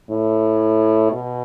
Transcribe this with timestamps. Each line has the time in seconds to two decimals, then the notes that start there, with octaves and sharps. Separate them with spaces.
0.10 A2
1.12 B2